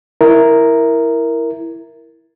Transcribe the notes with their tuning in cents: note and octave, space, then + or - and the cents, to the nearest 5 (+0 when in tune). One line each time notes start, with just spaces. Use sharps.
E4 +0 A#4 +0